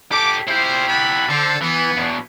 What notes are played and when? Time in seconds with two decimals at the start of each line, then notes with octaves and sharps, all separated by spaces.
0.12 G4 A4 D6
0.47 E4 F4 G4 C5
0.88 F#5 A5 B5
1.29 D3 A4 C5
1.62 E3 B3
1.97 E2 B2